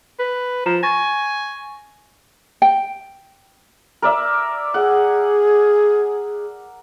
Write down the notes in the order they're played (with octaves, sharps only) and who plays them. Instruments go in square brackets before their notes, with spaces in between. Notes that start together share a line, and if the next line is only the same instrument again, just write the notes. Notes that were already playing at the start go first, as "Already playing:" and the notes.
[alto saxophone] B4
[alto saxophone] F3 [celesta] A#5 E7
[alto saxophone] G#5 [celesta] C#6 A6 A#6
[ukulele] G5
[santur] A#4 D5 E5
[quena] G#4 [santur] F#5